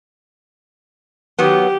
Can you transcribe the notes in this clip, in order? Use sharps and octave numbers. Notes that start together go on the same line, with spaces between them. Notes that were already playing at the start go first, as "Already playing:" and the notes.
D#3 F#3 B3 G4